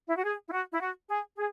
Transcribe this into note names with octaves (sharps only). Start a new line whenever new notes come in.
E4
F#4
G#4
E4
F#4
E4
F#4
G#4
G#4